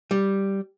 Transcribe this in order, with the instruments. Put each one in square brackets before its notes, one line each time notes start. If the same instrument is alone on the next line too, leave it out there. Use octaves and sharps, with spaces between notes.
[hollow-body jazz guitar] G3